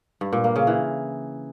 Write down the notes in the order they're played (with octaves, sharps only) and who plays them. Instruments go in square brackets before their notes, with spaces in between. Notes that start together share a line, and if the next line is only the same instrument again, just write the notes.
[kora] G2
A#2
A#3
C#3
E3